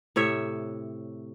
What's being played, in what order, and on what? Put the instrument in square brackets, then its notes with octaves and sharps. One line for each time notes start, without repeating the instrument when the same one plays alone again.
[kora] A2 C3 C#5 E5